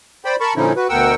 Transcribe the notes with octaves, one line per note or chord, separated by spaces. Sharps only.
C5 D5 G5 B5
A#4 A5 B5 C#6
A#2 D3 F3 C#4 D#4 E4
F#4 B4
D2 B2 A#4 F#5 G5 E6